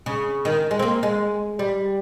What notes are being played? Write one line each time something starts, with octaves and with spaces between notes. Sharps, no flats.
C#3
D#3
G#3
C4
A#3
G#3
G3